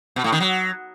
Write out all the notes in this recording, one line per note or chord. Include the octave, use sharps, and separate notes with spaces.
B2
A2
D#3
F#3